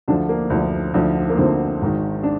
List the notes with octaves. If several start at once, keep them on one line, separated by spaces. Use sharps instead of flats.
D2 D3 F3 D4
A#3
D2 D3 F3
D2 D3 F3
A#3
D2 D3 F3 C4
G#1 G#2 D#3
D4